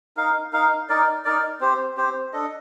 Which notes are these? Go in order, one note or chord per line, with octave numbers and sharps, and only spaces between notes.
D#4 A#4 F5
D#4 A#4 F5
D#4 A#4 D5
D#4 A#4 D5
C4 G4 C5
C4 G4 C5
D4 A4 D#5